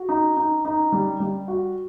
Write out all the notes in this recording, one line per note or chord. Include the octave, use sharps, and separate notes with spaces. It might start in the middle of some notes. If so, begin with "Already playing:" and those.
Already playing: F#4
D#4
D#4
D#4
G3
G3
F#4